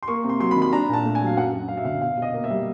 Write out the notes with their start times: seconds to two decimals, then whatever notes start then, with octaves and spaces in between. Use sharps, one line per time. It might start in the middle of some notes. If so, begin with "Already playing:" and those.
0.03 C6
0.08 A#3 C#6
0.24 C3
0.29 C6
0.40 F#3 C6
0.51 B5
0.56 D#3
0.62 B5
0.72 D4 A#5
0.89 A#2 A5
1.05 A3
1.15 G#5
1.21 F#3
1.27 F5
1.37 F#2 F#5
1.53 F#2
1.68 F#3 F5
1.77 E5
1.85 D3 F5
2.01 B2 F5
2.17 B2
2.22 D#5
2.34 A#3
2.44 E5
2.50 G3